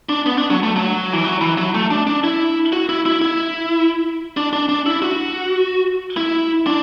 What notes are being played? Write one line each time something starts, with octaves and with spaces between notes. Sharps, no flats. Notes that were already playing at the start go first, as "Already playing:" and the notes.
D4
B3
D4
F#3
A3
F#3
E3
F#3
E3
F#3
A3
D4
D4
E4
F#4
E4
E4
E4
D4
D4
D4
E4
F#4
E4
D4